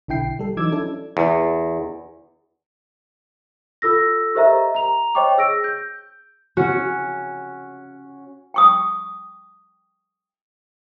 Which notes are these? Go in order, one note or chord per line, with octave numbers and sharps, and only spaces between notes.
B1 D3 E4 G5 C7
G3 A4
E3 F#3 D#4 D6 E6 G#6
C#4 D4 E4 A4
E2
F4 A4 E6 A#6
G4 A#4 C5 D#5 E5 A#5
A#5 F7
C5 C#5 D#5 G5 C#6 D6
G#4 E6 A#6 D7
G6
C#4 F#4
G5 C#6 D#6